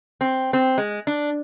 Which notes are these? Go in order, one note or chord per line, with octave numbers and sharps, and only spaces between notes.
C4
C4
G#3
D4